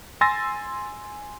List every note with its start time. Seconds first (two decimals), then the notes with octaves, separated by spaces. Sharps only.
0.21 G#5 C6 E6 A6 A#6